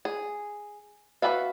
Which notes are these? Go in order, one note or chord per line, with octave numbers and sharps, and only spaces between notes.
G#4
F#4 G#4 B4 E5 F5